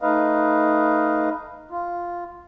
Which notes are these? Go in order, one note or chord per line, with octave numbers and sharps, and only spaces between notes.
A3 D#4 B4 D#5 F5
F4